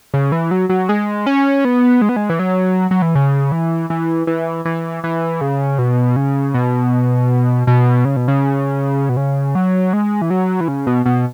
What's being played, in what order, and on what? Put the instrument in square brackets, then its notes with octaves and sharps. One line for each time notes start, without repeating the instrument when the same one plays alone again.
[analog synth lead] C#3
E3
F#3
F#3
G#3
C#4
B3
G#3
B3
G#3
E3
F#3
F#3
E3
C#3
E3
E3
E3
E3
E3
C#3
B2
C#3
B2
B2
C#3
B2
C#3
B2
C#3
F#3
G#3
E3
F#3
E3
C#3
B2
B2